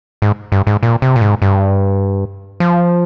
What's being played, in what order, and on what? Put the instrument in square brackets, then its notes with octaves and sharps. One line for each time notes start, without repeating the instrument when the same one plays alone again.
[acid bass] G#2
G2
G#2
A#2
C3
A#2
G#2
G2
F3